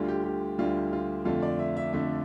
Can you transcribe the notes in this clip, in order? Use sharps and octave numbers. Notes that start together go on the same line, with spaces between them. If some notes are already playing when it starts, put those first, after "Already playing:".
Already playing: D2 D3 G3 F4
G4
G4
D2 D3 G3 F4
F4
F2 D3 A3 F4
D5
E5
E5
F2 D3 A3 E5